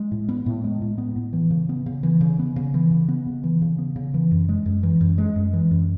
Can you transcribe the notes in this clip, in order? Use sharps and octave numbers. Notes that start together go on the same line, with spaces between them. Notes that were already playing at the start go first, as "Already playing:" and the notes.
Already playing: G#3
A2
B3
A2
G#3
A2
B3
A2
E3
C#3
B3
C#3
E3
C#3
B3
C#3
E3
C#3
B3
C#3
E3
C#3
B3
C#3
E3
F#2
G#3
F#2
E3
F#2
G#3
F#2
E3
F#2